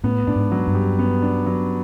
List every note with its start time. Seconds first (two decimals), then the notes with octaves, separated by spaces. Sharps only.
0.04 A2 B3
0.27 A2 D4
0.36 G#2
0.51 F#3
0.67 G2
0.74 G4
0.99 B3
1.22 D4
1.46 F#3